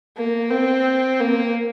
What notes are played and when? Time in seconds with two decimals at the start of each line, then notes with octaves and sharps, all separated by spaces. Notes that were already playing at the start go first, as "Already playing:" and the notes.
0.17 A#3
0.50 C4
1.20 A#3